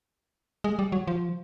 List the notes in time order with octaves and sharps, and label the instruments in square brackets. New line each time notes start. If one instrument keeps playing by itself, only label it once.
[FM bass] G#3
G3
F#3
F3